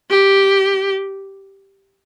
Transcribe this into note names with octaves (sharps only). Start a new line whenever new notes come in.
G4